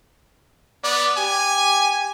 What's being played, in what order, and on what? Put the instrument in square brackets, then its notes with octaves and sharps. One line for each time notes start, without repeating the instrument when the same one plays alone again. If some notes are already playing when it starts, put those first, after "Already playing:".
[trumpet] B3 [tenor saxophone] D5
[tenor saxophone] G4 [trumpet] G#5